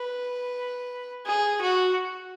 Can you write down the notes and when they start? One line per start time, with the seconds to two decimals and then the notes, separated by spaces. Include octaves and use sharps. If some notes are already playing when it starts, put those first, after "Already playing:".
Already playing: B4
1.26 G#4
1.62 F#4